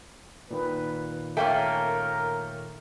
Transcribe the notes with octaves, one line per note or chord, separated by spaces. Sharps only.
A#2 D#3 B4
A3 A#3 C#4 A#4 G5